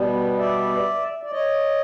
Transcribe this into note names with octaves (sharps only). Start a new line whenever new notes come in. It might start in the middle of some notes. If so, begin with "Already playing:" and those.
Already playing: B2 G3 B3
D5 E5
D5
C#5 D#5